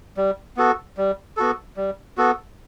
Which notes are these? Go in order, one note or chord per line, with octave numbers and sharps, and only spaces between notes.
G3
B3 F#4 A4
G3
B3 F#4 A4
G3
B3 F#4 A4